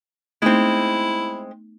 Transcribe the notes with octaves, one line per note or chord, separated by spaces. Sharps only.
G#3 A3 B3 C4 D#4 E4